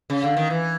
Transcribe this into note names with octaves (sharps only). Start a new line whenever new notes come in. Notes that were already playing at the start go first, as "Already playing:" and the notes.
C#3
D3
D#3
E3